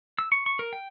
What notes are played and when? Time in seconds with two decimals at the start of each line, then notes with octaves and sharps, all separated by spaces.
0.19 E6
0.32 C#6
0.46 C#6
0.59 A#4
0.73 G5